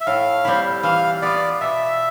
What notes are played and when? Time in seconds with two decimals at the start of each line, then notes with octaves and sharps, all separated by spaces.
0.01 E5
0.06 A2 F5
0.45 G3 C4 E4
0.83 E3 F5
1.22 B3 F4 D5
1.61 B2 E5